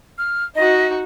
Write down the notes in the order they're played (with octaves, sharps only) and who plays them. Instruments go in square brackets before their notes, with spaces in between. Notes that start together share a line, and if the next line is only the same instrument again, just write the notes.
[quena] F6
[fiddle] D#4 F#4 [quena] D#5